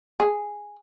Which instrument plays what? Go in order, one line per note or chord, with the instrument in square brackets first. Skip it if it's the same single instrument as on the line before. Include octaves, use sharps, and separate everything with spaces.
[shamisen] G#4